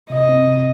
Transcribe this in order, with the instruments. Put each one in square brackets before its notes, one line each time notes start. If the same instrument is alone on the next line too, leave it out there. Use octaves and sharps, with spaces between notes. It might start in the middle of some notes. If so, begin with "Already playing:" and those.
[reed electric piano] C3 [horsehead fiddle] D#5
[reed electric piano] C4
C3